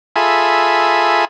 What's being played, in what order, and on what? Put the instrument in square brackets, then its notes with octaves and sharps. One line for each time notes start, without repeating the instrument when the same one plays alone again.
[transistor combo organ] F4 G#4 A4 E5 G#5 B5